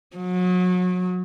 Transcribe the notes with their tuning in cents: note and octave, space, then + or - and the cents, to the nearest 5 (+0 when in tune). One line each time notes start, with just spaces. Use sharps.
F#3 -30